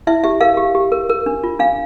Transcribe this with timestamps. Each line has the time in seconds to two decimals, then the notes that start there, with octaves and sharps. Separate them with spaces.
0.07 E4 E5
0.24 G4 E5
0.41 A#4 F5
0.57 G4
0.75 G4
0.92 A#4
1.09 A#4
1.26 D4
1.44 F4
1.59 D4 F5